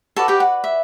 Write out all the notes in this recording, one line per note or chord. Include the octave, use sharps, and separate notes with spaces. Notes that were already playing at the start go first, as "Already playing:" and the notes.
F#4 A4 B4 D5 A5
G4 G5
F#5
E5